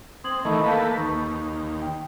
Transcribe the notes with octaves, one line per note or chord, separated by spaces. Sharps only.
C4 D#6 G#6 F#7
D#3 E3 A3 D#5 B5 C#6
A#3 A4 B4 F5 A5 G6
D#2 C#6
G5